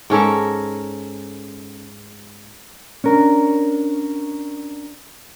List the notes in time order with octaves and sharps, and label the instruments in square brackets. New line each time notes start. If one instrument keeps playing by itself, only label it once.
[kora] G#2 C#4 A4 A#4
[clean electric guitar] C#4 D4 A#4